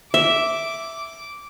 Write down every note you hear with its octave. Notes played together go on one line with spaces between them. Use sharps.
E5 D6